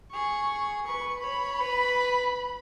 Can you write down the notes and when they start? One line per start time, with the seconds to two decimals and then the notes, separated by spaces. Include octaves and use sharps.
0.13 G#4 C#6
0.87 B4 C#6
1.24 C#5 B5
1.60 B4